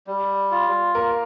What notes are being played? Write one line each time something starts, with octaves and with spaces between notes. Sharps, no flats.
G3
F4
A#3 A#4